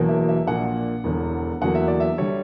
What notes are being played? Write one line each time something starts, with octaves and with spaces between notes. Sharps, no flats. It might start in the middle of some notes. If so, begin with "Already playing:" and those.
Already playing: E1 E2 B2 F#3 A#3
E5
E5
A#1 A#2 A#3 F#5
E1 E2 D3
E2 D3 F#3 A#3 F#5
E5
D5
E5
D3 G3 C#5